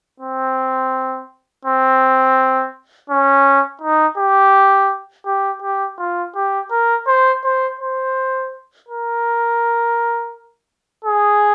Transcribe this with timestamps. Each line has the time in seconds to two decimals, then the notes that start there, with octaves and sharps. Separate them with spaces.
0.20 C4
1.65 C4
3.10 C#4
3.82 D#4
4.18 G4
5.26 G4
5.62 G4
5.98 F4
6.35 G4
6.71 A#4
7.07 C5
7.44 C5
7.79 C5
8.88 A#4
11.05 G#4